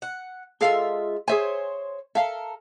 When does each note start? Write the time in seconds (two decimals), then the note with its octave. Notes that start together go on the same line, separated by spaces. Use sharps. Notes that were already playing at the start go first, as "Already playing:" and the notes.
0.02 F#5
0.61 G#3 F4 A4 E5 F5
1.28 G#4 C5 C#5 E5 G#5
2.15 A4 A#4 E5 F5